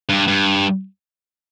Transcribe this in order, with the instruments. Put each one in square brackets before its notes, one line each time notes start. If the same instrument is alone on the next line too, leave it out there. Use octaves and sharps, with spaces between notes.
[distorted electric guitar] G2
G2